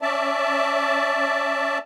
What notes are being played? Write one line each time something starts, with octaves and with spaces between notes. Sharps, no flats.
C#4 D5 E5 A5